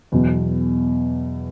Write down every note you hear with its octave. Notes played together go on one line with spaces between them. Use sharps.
E2 B2 F#3